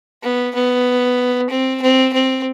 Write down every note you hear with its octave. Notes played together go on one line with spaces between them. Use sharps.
B3
B3
C4
C4
C4